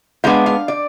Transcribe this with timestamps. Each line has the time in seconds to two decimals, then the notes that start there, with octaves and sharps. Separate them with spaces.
0.24 B2 G#3 B3 D4 F5
0.46 F5
0.68 D5